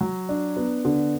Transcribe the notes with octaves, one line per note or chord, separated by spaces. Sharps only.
F#3
D4
B3
D3